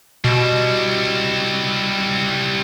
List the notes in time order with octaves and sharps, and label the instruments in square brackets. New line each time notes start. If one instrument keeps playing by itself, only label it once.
[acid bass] B2 [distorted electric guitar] G3 E4